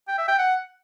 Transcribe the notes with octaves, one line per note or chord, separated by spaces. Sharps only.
G5
E5
G5
F#5